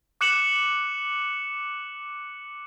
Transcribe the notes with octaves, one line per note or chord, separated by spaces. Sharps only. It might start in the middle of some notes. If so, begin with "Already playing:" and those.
D6 F#6 C#7 E7 F#7